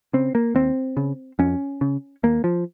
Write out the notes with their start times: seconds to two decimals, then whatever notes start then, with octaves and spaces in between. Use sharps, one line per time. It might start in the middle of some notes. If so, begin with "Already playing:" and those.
0.13 C#3 C4
0.35 A#3
0.55 D#2 C4
0.97 C#3
1.39 F2 C#4
1.81 C#3
2.23 D#2 A#3
2.44 F3